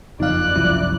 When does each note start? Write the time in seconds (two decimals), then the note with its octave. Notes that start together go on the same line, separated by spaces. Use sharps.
0.20 F#1 F2 D#4 D5 F5 F#6
0.56 F#1 C2 F#2 F3 E4